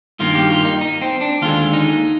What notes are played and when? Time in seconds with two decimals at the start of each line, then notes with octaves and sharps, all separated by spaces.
0.20 G2 D#3 A#3 F4
0.35 G4
0.50 F4
0.65 D#4
0.81 D#4
1.02 C4
1.21 D4
1.42 D#2 D3 G#3 F4
1.73 D#4